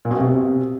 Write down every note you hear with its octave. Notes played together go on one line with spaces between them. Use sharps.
A#2
B2
C3